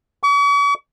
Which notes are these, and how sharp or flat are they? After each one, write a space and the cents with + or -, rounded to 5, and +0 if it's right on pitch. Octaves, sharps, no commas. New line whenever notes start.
C#6 +45